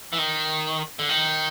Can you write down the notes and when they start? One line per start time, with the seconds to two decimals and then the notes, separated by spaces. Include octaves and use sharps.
0.13 E3
0.18 D#3
0.99 D3
1.09 D#3